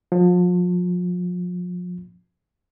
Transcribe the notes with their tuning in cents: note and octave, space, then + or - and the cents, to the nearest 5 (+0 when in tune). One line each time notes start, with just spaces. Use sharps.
F3 +35